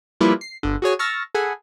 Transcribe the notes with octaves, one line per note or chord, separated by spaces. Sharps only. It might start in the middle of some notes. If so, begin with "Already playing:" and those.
F3 G3 A#3 E4 B4 E5
C7
G1 D3
F#4 G#4 C#5 G#5
A5 C#6 E6 F6 A6 A#6
G#4 A4 F#5 G#5 B5